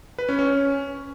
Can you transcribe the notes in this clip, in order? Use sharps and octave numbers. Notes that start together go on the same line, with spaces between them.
B4
C#4
C#4